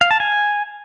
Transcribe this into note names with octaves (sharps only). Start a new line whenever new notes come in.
F5
A5
G#5